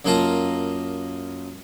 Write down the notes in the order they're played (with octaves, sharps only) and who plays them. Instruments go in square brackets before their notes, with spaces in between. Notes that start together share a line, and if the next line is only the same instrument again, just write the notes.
[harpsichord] F#2 A#3 D#4 F4 A5 A#5